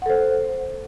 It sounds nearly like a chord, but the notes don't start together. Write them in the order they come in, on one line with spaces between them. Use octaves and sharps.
F#5 A4 C5